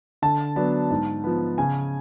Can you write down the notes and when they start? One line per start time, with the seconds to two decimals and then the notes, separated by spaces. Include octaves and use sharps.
0.22 D3 A5
0.56 F#3 B3 D4
0.91 G#2
1.24 F3 B3
1.58 C#3 G#5